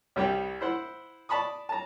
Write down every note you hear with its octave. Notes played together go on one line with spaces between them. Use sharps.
C2 G3 G5
E4 C5 F#5
D5 A5 B5 C#6 D#6
A5 A#5